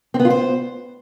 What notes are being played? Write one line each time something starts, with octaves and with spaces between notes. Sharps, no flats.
C4
B3
F4
C5